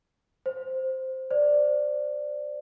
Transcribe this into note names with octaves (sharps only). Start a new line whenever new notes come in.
C5
C5 D5